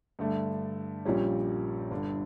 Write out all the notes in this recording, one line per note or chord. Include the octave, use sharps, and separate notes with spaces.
G2 D3 A3
A#1 A#2 G3 C#4
G1 G2 D3